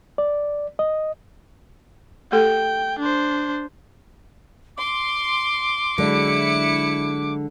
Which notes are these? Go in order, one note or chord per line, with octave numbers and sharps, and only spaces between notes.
D5
D#5
A3 G4 A4 G5
D4 C5
C6 D6
D3 F#3 G#3 E4 D5 C#7